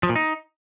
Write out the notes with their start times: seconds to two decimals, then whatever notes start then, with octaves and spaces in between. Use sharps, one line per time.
0.03 F3
0.09 A#2
0.16 D#4